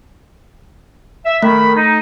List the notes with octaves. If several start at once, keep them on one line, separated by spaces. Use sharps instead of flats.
E5
D#3 A3 B5
D#4